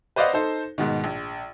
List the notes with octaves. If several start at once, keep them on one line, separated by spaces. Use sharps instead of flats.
B4 C5 D5 D#5 F5 F#5
D#4 A4 C5
G#2 B2 D#3
A#1